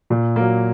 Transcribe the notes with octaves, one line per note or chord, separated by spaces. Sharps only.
A#2
F#3 A#3